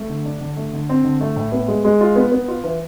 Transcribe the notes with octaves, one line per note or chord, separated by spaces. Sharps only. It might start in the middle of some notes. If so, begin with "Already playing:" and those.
Already playing: A3
D3
D4
D3
A3
D3
C4
D3
A3
A2
B3
G#3
G#3
F4
B3
B3
F4
E3